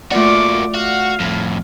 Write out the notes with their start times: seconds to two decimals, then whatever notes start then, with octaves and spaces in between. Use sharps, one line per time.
0.12 A3 A#3 F4 F#4 D5 D6
0.74 F#4 F5
1.20 F2 A2